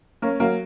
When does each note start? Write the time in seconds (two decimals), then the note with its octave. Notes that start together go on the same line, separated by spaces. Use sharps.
0.22 A#3 C#4
0.40 F#3 A#3